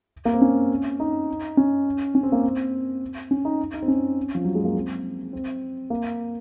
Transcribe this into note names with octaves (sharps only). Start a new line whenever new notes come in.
A#3
C4
C#4
D#4
C#4
C#4
C4
A#3
C4
C#4
D#4
D#4
C4
C#4
F3
F#3
G#3
A#3
C4
C4
A#3